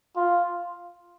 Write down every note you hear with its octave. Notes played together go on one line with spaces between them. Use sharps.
F4